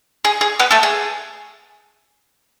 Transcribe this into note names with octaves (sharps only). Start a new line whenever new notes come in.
G#4
G#4
B3 B4
A3 A4
G#4